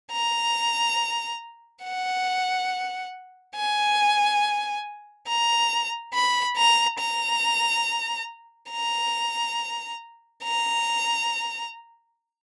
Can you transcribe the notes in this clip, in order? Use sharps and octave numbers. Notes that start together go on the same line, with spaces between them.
A#5
F#5
G#5
A#5
B5
A#5
A#5
A#5
A#5